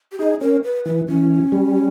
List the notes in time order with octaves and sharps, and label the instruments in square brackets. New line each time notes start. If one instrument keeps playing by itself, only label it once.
[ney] G4
[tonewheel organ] D#4 [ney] G#4
[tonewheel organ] C#4 [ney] A#4
[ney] B4
[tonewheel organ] E3 [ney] B4
[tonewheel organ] E3 [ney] C#4
[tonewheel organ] G3